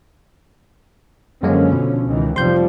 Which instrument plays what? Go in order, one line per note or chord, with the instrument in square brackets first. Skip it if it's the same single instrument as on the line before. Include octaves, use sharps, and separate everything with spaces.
[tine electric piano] F#2 G#3 A#3 [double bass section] D3 F3 C#4
[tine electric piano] B2
[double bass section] C#2 D#3 E3
[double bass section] F1 F3 G3 [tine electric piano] C6 G6